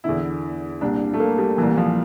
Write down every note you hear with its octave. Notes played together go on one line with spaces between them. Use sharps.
E2 D3 E4
C2 A#2 D4
A3
A#3
G3
C2 A#2 E3
F3